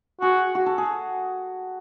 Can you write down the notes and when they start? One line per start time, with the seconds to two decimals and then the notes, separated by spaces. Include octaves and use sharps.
0.21 F#4 G#4
0.55 F#4
0.66 A4
0.78 G#4